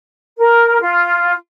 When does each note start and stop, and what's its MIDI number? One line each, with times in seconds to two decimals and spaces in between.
0.38 0.79 70
0.80 1.33 65